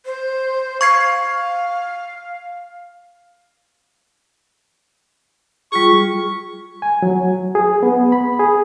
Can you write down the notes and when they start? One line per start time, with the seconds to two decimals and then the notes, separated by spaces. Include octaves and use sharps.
0.06 C5
0.81 F5 C#6 G#6 C7
5.72 G3 F4 G#4 C#6
6.82 G#5
7.02 F#3
7.55 G#4
7.83 B3
8.12 B5
8.39 G#4